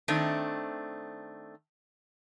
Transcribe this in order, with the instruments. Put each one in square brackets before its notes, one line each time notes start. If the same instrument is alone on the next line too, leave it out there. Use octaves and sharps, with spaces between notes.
[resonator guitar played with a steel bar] D#3 A3 C4 D4